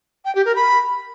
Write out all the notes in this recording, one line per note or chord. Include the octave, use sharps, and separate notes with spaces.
G5
G4
A#4
B5